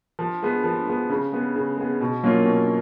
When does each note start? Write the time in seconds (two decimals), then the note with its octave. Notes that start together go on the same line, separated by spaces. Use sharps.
0.19 F3
0.43 G#3 B3
0.64 F3
0.87 G#3 B3
1.10 C#3
1.32 G#3 B3
1.56 C#3
1.77 G#3 B3
2.01 B2
2.24 F#3 A#3 C#4 F4
2.45 B2